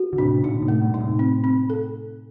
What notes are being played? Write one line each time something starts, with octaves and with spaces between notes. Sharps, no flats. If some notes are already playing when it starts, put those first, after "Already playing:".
Already playing: F#4
D3
A2 C3 D4
C3
A#2 D3 D#4
A2 C3
A3
G2 A#2
D#4
A2 C3
C4
C4
A4